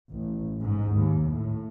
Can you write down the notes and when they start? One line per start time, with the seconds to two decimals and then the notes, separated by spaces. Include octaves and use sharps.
0.11 A1
0.61 G#2
0.96 D#2
1.30 A2